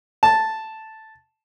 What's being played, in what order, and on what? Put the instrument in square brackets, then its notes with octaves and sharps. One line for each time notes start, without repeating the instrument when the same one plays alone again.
[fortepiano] A5